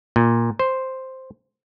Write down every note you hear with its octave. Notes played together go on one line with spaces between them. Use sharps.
A#2
C5